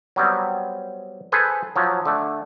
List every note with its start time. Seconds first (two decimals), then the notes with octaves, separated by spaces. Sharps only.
0.16 F#3 G3 B3 C4
1.32 G#4 A4 B4 C5
1.76 F3 F#3
2.05 D3 A3